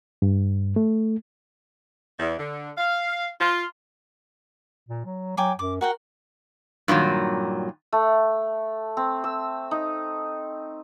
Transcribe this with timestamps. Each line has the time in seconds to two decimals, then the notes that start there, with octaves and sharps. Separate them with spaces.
0.22 G2
0.76 A3
2.19 E2
2.38 D3
2.78 F5
3.40 F4
4.89 A#2
5.06 F#3
5.37 F#3 G5 G#5 D6
5.59 F#2 D6
5.81 F#4 A#4 F#5 G5
6.88 G2 A#2 D#3 F#3
7.92 A3
8.97 C4
9.24 E6
9.71 D#4